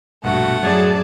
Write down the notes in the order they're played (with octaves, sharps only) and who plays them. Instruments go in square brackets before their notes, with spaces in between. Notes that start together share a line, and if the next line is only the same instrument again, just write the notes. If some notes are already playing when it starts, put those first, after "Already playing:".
[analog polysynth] A#1 B2 F#4 [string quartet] G2 [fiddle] A3 F#5
[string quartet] F#2 D5 [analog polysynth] A2 F#3 [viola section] G#4 A5